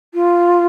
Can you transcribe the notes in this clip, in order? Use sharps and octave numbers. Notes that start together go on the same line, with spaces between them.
F4